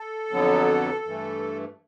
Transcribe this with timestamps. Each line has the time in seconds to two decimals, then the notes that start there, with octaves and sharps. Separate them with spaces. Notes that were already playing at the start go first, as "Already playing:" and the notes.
Already playing: A4
0.30 F2 D3 F#3 B3
1.05 G2 E3 A3